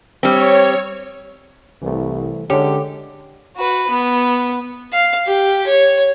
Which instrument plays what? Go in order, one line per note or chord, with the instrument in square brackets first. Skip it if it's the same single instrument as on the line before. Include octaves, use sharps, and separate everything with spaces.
[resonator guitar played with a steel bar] G3 C4 [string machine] C#5
[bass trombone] C2 [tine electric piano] E3 A3
[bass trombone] D3 [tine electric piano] G#3 C#4 [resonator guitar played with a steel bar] G4 [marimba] C#5
[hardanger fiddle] F#4 B4
B3
F5
G4
C#5